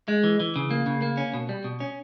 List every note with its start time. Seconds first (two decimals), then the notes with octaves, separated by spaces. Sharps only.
0.08 G#3
0.24 E3
0.40 E3
0.56 C#3
0.71 A#3
0.87 C#3
1.02 A#3
1.17 C#4
1.34 B2
1.49 G3
1.64 B2
1.80 C#4